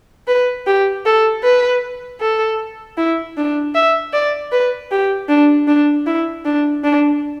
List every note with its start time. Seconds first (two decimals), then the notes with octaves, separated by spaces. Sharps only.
0.27 B4
0.66 G4
1.06 A4
1.43 B4
2.21 A4
2.97 E4
3.37 D4
3.74 E5
4.13 D5
4.52 B4
4.91 G4
5.29 D4
5.68 D4
6.06 E4
6.45 D4
6.84 D4